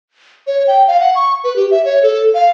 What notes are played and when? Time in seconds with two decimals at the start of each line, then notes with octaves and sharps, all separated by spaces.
0.47 C#5
0.67 G5
0.87 F5
1.00 F#5
1.15 C#6
1.44 B4
1.56 G4
1.71 E5
1.85 C#5
2.03 A4
2.34 F5